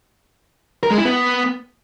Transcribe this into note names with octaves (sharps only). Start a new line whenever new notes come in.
A#4
G#3
E4
B3